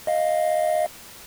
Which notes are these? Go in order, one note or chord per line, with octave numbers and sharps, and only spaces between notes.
D#5 F5